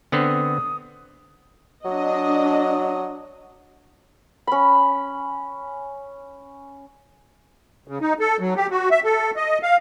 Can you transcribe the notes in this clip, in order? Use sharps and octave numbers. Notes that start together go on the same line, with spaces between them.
D3 B3 C4 D#6
F#3 D4 D#5
C#4 B5
C#3
D#4
A4
F#3
G4
F#4
E5
A4
D#5
F5